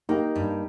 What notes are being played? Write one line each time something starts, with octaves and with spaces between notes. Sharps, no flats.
A#3 D#4 G4
G2